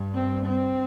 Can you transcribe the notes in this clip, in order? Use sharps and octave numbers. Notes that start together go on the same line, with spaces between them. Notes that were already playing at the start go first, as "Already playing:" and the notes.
Already playing: G2
C4
C4